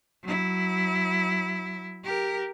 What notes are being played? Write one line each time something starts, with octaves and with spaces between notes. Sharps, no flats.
F#3 E4
G4 A#4